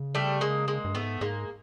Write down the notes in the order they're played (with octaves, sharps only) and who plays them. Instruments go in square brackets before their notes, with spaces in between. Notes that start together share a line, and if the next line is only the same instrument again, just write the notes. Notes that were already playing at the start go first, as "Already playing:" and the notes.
Already playing: [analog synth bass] C#3
[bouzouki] G3 A3
G#3 A#3
G#3 A#3
[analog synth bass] G2
[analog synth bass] G#2 [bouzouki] A3 B3
[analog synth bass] G#2 [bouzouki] G#3 A#3